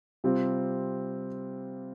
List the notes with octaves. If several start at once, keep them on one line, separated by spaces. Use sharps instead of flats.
C3 G3 C4 F4